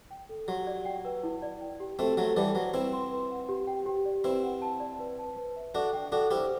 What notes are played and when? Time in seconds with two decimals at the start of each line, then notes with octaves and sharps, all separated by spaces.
0.11 G5
0.29 A4
0.48 F#3 G4
0.67 D5
0.85 G5
1.05 B4
1.24 E4
1.42 D5
1.61 G5
1.80 G4
1.99 A3 C4 F#4
2.17 F#3 A3 F#5
2.37 E3 G3 A5
2.55 F#3 C5
2.74 C4 E4 B4
2.93 C6
3.11 B4
3.31 F#5
3.49 G4
3.67 G5
3.86 G4
4.05 D5
4.24 C4 E4 B4
4.43 F#5
4.62 A5
4.80 D5
4.99 B4
5.19 A5
5.37 B4
5.56 E5
5.74 D4 F#4 A4
5.93 G5
6.12 D4 F#4 A4
6.31 E4 G4 C5